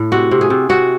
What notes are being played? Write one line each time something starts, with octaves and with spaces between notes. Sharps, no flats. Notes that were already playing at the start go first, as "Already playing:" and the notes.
Already playing: A2
C3 F#4
C3
G#4
C3
C3 F#4